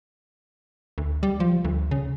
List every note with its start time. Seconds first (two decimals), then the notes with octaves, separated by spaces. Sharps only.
0.98 D2
1.23 G3
1.40 F3
1.65 D2
1.91 C#3